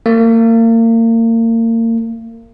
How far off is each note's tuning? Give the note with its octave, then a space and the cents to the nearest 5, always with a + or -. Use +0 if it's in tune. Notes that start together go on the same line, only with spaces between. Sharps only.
A#3 -35